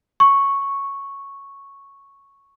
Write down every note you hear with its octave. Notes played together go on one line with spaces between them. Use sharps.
C#6